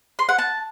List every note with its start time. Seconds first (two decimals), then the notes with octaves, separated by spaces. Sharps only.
0.19 C6
0.29 F#5
0.39 A5